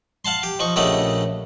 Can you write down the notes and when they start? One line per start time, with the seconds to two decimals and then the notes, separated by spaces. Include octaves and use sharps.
0.25 F5 F#5 A5 C6
0.43 G4
0.59 F3 D#4 C#6
0.76 A#1 C#3 A3 G4 D#5 F#5